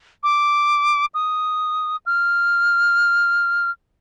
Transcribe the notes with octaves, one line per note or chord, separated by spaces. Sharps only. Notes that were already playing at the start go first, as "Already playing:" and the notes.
D6
D#6
F6